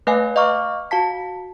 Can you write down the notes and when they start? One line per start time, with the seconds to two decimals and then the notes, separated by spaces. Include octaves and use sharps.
0.07 A3 B4 D#5 F5 G#5 F#6
0.36 D#5 F5 A#5 C#6 D6 F6
0.91 F#4 F5 A5 B6